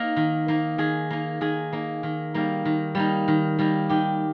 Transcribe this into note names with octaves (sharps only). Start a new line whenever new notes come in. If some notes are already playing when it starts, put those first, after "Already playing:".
Already playing: A#3 D#4 A#4
D#3
A#3 D#4
D#3 G#4
A#3 D#4
D#3 G#4
A#3 D#4
D#3
G3 A#3 D#4
D#3
G3 A#3 D#4
D#3
G3 A#3 D#4
D#3 G4